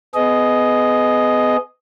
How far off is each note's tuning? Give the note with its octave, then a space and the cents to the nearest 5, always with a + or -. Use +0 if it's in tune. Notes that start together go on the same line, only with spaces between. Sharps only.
B3 +30 G#4 +25 D#5 +0